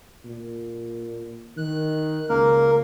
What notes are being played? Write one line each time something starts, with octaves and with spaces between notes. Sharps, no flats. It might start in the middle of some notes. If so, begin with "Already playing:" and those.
A#2
D#3 F#6
C#2 A#3 A#4